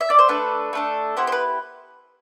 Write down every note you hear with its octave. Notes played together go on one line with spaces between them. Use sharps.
E5
D5
C5
A3 D4 A4 B4
A3 D4 A4
B3 E4 G4 C5
C5
B4